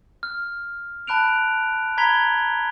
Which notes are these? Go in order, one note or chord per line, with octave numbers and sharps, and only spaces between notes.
F6
A5 B5 F#6 D7 F7
A#5 B5 G#6 B6 F7 G7